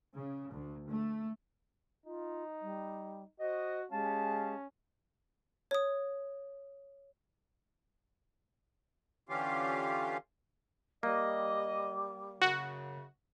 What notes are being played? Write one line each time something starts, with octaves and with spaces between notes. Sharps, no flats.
C#3
D2
A3
D#4 F4
G3
F#4 C5 D#5
G#3 C#4 G4 F5 A5
C#5 D#6
D3 E3 C#4 F4 G4 F5
G3 A#3 D#5
F#2 C#3 F#4